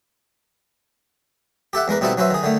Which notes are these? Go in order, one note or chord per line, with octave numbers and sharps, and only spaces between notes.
G4 A4 E5 F#5
E2 G#3 A#4 B4
B2 G3 C4 D#4 E4 A4
F#3 C#4 B4 C5 E5
D#3 G#4
D3 D#3 A3